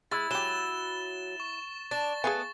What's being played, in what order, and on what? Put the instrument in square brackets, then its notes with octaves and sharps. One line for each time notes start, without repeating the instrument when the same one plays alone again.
[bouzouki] G#3 [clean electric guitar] E4 [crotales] A6
[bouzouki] F#3 [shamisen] G#3 G4 [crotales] E7 G7
[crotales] C#6
[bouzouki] D4 [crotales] A6
[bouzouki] A3 B3 [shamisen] G#4 F5 G#5